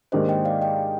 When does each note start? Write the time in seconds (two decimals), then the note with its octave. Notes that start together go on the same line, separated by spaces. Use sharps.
0.12 G#2 D#3 A#3 D4 G4 C5 D#5
0.29 D#5 G5
0.45 D5 F5
0.61 D#5 G5